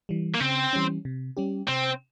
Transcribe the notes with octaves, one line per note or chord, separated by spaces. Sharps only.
E3 G3
A#3
C#3 C4
E3 G3 C#4
C3
G3 C#4 G4
C3 C4